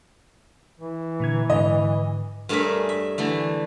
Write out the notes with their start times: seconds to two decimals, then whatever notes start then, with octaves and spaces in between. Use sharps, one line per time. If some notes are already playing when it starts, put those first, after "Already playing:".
0.79 E3
1.20 A#2 D3 G#6
1.50 G#2 D3 D#5
2.49 G2 A3 G#4 A#4 C#5 E5
2.89 E5
3.18 D3 E3 A3